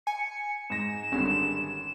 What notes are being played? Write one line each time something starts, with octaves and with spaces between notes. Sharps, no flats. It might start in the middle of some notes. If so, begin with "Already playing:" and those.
G#5 C#7
G#2 A#6 E7
G#1 D3 G3 C#4